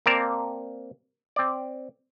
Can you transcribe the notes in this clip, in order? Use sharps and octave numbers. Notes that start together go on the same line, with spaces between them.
A#3 C4 A#4 D5 F5 A5
C4 D5